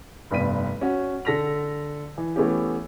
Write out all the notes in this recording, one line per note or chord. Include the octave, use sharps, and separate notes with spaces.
F1 G2 B3 B6 D#7
C#4 F#4
D3 A4 A#6 B6 F7
E3
E3 A3 B3 C#4 G4